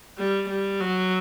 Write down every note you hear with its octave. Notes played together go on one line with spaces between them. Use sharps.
G3
G3
F#3